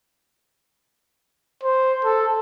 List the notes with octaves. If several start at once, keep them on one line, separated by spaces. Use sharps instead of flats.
C5
A4